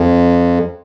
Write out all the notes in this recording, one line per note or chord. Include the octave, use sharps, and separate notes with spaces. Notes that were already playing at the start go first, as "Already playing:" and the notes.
Already playing: F2